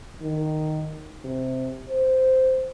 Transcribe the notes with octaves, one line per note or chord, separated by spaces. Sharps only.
D#3
C3
C5